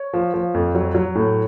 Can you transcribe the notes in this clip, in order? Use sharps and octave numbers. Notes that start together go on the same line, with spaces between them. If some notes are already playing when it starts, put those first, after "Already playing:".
Already playing: C#5
F3
F3
F2
F#3
F#3
A2